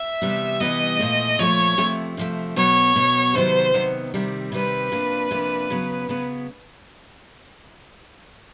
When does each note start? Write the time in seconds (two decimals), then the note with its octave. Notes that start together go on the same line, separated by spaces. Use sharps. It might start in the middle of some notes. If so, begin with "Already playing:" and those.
Already playing: E5
0.22 C3 E3 G3 B3
0.60 C3 E3 G3 B3 D#5
0.99 A#2 F3 A3
1.39 A#2 F3 A3 C#5
1.78 C3 F3 A3
2.17 C3 F3 A3
2.56 B2 F#3 B3 C#5
2.96 B2 F#3 B3
3.34 C3 D#3 F#3 B3 C5
3.74 C3 D#3 F#3 B3
4.14 C3 D#3 G3 C4
4.52 C3 D#3 G3 C4 B4
4.92 C3 F3 A#3 D4
5.31 C3 F3 A#3 D4
5.70 C#3 F#3 B3
6.09 C#3 F#3 B3